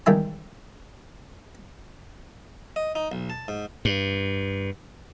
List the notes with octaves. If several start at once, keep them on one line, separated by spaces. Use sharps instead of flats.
E2 G#2 D#3 G3 E5 G#5
D#5
D#4
B1
A5
G#2
G2